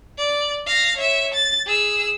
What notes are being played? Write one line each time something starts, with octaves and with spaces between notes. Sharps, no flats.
D5
F5 A#6
C#5 E5
A6
G#4 E6